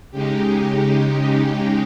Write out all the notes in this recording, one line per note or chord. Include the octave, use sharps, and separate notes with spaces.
C#3 G#3 D#4 G4